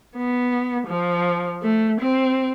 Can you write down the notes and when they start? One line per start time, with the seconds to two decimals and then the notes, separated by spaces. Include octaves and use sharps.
0.17 B3
0.88 F3
1.62 A3
2.01 C4